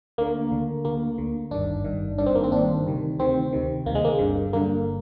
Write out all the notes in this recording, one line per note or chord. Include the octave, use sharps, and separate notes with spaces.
D2 D3 A#3
D2 D3
D2 D3 A#3
D2 D3
G#1 G2 D#3 D4
G#1 G2 D#3
G#1 G2 D#3 D4
C4
A#3
C4
G#1 G2 D#3 D4
D2 C3 D#3
D2 C3 D#3 C4
D2 C3 D#3
D2 C3 D#3 A#3
G#3
A#3
G1 G2 D3
G1 G2 D3 A#3